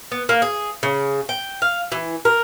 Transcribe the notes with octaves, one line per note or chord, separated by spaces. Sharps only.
B3
A#3
G#4
C#3
G5
F5
E3
A#4